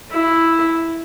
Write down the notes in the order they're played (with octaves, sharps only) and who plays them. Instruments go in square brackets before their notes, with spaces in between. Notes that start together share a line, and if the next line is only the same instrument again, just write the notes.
[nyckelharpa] E4